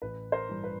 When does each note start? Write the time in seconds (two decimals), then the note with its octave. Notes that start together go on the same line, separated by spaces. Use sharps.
0.02 A1 B4
0.32 A#4 C5
0.49 G2 E3
0.64 B4